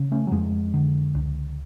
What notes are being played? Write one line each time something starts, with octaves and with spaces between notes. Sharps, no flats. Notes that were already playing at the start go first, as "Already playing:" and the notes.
Already playing: C#3
A3 C#4
F#3
F2 F3 G#3
D3
C#2